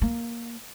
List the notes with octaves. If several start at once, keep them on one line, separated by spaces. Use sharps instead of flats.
A#3